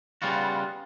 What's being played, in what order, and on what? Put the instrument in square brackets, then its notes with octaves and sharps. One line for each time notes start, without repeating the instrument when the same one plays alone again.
[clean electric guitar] C#3 G3 B3 F4 F#4